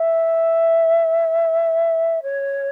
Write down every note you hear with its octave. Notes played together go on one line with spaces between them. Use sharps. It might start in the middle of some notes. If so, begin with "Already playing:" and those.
Already playing: E5
C#5